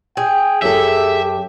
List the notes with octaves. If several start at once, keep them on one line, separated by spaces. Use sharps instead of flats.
G#4 G5
F#2 G4 A4 E5